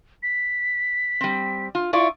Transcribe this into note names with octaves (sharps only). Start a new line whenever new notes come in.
B6
G3 C4
F4
E4 F4 D5 C#6